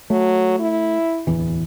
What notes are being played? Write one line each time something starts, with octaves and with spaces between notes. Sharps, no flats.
F#3 A3
E4
D1 E2 E3